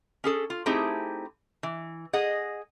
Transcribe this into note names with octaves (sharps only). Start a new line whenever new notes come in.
C#4 G#4 A4
F4
A3 C4 D#4 E4 G4 G#4
E3
G#4 D#5 F#5